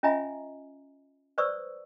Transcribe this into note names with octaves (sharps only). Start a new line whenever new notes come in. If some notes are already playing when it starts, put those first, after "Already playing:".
C#4 F4 D#5 E5 G#5 A#5
B4 C5 D5 C#6 D#6 E6